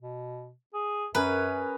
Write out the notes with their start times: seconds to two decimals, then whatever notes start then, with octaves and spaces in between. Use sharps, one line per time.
0.02 B2
0.74 G#4
1.15 F#2 C#4 G#4 A#4 B4